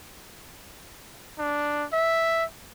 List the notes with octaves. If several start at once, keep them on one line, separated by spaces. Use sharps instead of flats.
D4
E5